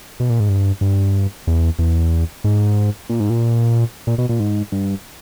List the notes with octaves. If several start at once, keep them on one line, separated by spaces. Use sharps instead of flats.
B2
A#2
G#2
G2
G2
E2
E2
G#2
A#2
G#2
A#2
A#2
B2
A#2
G#2
G2